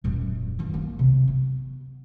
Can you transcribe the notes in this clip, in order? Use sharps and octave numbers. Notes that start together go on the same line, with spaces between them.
D#1 F#2
D#3 F3
A#3
C3
B3